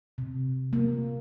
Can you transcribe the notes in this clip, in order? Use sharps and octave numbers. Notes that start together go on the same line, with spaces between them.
C3
A#3